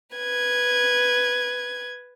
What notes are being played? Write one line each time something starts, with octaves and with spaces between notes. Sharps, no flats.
B4 G#6